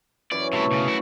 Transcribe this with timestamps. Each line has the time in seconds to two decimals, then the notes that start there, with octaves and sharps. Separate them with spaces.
0.31 F#2 E3 D5
0.53 C3 A3 E4
0.71 B1 C#3
0.88 E4 F#4